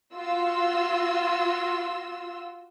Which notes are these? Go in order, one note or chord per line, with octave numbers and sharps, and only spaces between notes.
F4 F#4 C6 E6